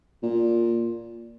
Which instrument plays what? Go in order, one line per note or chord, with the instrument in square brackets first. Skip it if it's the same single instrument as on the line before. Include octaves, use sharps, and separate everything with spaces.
[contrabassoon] A#2